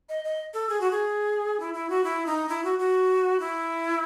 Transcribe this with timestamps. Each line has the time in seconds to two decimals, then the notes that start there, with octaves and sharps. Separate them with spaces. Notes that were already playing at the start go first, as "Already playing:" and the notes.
0.09 D#5
0.24 D#5
0.54 A4
0.69 G#4
0.81 F#4
0.91 G#4
1.60 E4
1.74 E4
1.90 F#4
2.04 E4
2.26 D#4
2.49 E4
2.64 F#4
2.79 F#4
3.40 E4